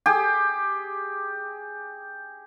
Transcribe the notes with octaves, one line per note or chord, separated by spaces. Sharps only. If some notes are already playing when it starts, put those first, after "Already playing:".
G4 G#4